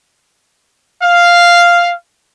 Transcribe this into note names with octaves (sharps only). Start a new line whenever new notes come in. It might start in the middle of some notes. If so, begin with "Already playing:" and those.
F5